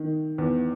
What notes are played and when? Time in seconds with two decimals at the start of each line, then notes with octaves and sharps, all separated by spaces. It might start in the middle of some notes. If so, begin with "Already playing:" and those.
Already playing: D#3
0.38 E2